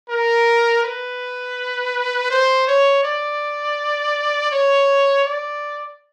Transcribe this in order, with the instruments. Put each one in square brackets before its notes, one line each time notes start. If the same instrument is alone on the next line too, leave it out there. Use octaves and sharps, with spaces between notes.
[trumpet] A#4
B4
C5
C#5
D5
C#5
D5